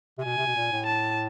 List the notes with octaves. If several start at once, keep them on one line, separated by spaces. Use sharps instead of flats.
C3
B2 G#5
C3
B2
A#2
A2
A5